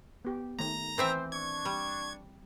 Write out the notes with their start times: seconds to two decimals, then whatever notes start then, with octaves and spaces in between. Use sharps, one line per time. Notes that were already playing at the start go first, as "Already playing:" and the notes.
0.25 B3 G4
0.59 D#3 A3 A#5 A#6
0.98 E3 C4 C5 E5
1.32 D4 C#6 G#6
1.65 G3